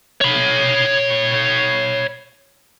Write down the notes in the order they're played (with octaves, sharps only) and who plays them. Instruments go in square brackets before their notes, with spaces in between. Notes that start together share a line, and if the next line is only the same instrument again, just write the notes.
[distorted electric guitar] C#5 B5